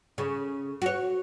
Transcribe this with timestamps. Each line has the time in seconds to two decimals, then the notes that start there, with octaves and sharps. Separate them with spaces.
0.18 C#3
0.82 F#4 C#5